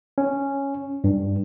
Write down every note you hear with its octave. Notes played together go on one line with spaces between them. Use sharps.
C#4
G2